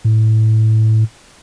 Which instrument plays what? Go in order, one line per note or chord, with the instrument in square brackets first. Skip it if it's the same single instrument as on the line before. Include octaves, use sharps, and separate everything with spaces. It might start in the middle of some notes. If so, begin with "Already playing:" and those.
[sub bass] A2